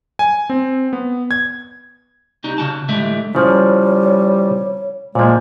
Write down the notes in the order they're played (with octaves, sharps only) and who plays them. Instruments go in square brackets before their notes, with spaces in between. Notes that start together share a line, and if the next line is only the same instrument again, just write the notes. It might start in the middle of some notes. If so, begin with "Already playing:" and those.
[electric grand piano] G#5
C4
B3
G#6
[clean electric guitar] C2 G3 D#4 F#4
C#3 F#4 A5
A2 D3 E3 G3 G#3 E5
[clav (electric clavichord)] C#3 F3 [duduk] G3 [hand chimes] E4 C5 [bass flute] C#5
[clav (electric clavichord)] A#2 F3 [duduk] G#3 [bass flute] A#3 [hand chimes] C5 G#6